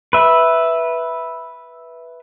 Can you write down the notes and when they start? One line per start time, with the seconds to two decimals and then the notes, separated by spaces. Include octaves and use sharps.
0.13 B4 E5